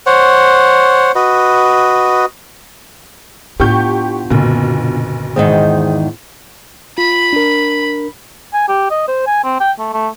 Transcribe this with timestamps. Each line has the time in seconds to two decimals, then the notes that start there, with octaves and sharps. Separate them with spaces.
0.06 C5 C#5 F#5
1.15 F#4 B4 D#5
3.60 A2 B3 D4 E4 F4 G4 C#6 G6
4.30 F#1 B1 A#2 D3
5.36 E2 G#2 D#3 G#4 C5 G5
6.98 F4 B5
7.33 D4 A#4
8.53 G#5
8.68 G4
8.91 D#5
9.08 C5
9.27 G#5
9.44 C4
9.60 G5
9.79 A3
9.93 A3